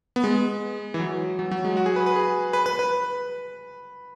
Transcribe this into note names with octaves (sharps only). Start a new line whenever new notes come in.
B3
G#3
E3
F#3
F#3
F#3
G#3
F#4
G#4
B4
B4
G#4
B4
B4
B4